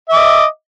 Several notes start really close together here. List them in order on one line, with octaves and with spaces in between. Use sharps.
E5 D6 D#5